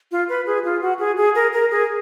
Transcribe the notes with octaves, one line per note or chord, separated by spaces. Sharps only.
F4
B4
G#4
F4
F#4
G#4
G#4
A#4
A#4
G#4